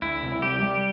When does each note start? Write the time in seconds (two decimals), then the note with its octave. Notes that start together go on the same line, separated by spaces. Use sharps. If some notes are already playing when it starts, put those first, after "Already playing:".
0.02 D2 E4
0.23 C3
0.42 G3 G4
0.62 G3